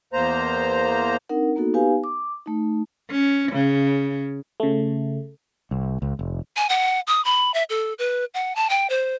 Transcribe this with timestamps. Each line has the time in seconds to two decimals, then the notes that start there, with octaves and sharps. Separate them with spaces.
0.13 E2 A#3 C5 A#5
1.29 C4 D4 D#4 A#4 F#5
1.56 A#3 B3 D#4 F#4 A4
1.74 B3 D#4 G4 B4 F5 G#5
2.04 D6
2.46 A3 D#4
3.10 C#4
3.53 C#3
4.60 C#3 A3
5.71 C2
6.02 C#2
6.19 F1
6.57 G#5
6.69 F#5
7.07 D#6
7.25 B5
7.54 E5
7.70 A4
7.99 B4
8.34 F#5
8.56 A5
8.70 G5
8.90 C5